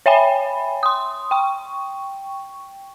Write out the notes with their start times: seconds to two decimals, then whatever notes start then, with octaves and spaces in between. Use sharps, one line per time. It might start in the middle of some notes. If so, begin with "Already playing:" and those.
0.06 C#5 E5 G5 G#5 B5
0.83 C6 D#6
1.31 G5 C#6